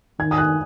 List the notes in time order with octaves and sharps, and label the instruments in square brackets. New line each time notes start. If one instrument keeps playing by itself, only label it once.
[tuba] D#3 [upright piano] G#6
[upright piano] D#6
F#6